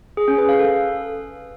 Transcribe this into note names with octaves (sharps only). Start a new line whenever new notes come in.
G#4
C#4
B4
F5
A4